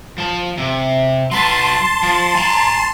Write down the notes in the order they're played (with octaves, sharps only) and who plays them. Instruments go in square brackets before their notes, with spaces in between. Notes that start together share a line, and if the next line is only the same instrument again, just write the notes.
[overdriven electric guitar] F3 A5
C3
[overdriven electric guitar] F#3 B4 [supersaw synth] A5 C6
[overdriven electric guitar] F3
G#5 A#5